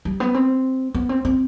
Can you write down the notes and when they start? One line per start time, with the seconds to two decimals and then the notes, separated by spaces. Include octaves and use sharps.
0.05 G3
0.20 B3
0.34 C4
0.95 B3
1.09 C4
1.25 C4